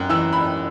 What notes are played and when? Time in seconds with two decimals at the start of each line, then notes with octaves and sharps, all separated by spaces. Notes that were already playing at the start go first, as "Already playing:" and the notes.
Already playing: F#2 F#6
0.09 E3 E6
0.33 B5